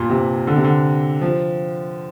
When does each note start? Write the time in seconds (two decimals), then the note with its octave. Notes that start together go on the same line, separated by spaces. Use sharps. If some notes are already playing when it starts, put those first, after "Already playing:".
Already playing: G2 A#2
0.10 C3
0.47 D3
0.56 C3
0.64 D3
1.21 F3